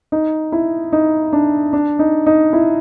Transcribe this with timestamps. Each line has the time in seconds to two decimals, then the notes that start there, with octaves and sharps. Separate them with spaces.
0.12 D#4
0.52 E4
0.93 D#4
1.33 D4
1.73 D4
1.99 D#4
2.26 D#4
2.53 E4